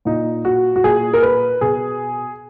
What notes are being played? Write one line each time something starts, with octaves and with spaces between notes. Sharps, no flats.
A#2 D#4
F#4
F#4
A#2 G#4
A#4
B4
B2 G#4